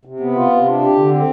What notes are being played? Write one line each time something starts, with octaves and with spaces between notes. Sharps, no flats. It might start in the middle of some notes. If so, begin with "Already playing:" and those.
C3
B3
F4
C3
D4
G4
D3
C4